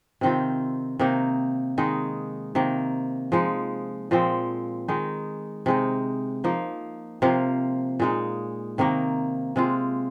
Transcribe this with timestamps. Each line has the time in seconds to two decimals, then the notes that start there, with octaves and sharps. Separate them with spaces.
0.21 C3 D#3 C4 F4
0.99 C3 D#3 A#3 D#4
1.78 D#3 G#3 D#4
2.55 C3 D#3 A#3
3.32 F3 G#3 D#4
4.11 A#2 F3 G#3 C4
4.88 D#3 G#3 D#4
5.66 C3 G#3 D#4
6.44 F3 A#3 D#4
7.22 C3 F3 A#3 F4
8.00 A#2 G#3 D#4
8.78 C3 D#3 A#3
9.56 C3 G#3 F4